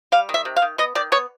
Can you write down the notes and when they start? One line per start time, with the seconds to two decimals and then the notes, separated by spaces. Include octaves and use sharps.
0.12 G3 F5
0.29 D#3
0.34 E5
0.45 C3
0.56 F5
0.62 D#3
0.78 B3 D#5
0.95 D#3 D5
1.12 B3 C#5